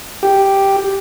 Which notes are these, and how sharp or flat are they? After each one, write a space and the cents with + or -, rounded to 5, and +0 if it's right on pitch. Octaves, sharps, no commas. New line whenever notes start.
G4 +0